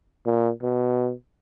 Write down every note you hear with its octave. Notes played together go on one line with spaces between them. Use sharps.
A#2
B2